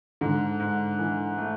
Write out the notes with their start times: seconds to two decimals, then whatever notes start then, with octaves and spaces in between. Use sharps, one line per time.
0.21 G#2 D3
0.60 G#2
0.99 E3
1.38 A3